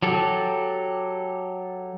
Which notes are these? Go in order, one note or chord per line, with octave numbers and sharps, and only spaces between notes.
F#3 G4 A4